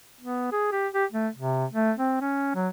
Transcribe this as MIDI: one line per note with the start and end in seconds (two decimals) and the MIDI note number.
0.21 0.49 59
0.52 0.70 68
0.72 0.88 67
0.93 1.05 67
1.12 1.28 57
1.36 1.65 48
1.72 1.92 57
1.98 2.16 60
2.21 2.53 61
2.55 2.68 54